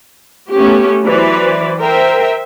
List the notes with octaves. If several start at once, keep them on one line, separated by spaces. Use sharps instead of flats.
A3 B3 C#4 G4
E3 F#3 B4 C5 D5
A#4 C5 E5 G5